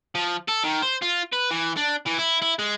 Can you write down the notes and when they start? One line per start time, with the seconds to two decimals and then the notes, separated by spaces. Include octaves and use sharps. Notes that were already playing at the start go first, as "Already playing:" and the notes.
0.15 F3
0.49 A4
0.64 D#3
0.82 C5
1.02 F4
1.32 B4
1.51 E3
1.77 D4
2.07 E3
2.19 E4
2.42 E4
2.59 G#3